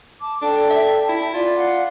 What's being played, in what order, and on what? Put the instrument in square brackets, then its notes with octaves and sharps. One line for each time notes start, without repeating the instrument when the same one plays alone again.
[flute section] A5 D6
[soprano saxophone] D4 [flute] A4 [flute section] D5 G5 A5
[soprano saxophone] E5
E4
[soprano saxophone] F4 [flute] D5
[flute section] F5 F#5